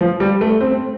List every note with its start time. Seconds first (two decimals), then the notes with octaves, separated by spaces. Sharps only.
0.01 F3
0.20 G3
0.41 A3
0.61 C4